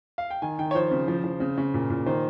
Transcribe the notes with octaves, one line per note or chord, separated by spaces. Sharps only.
F5
G5
D#3 G#5
D#3 G5
C#5
F3 C5
C#3
F3
F3
C#3
C#3
A#2
A#2
D#3 C5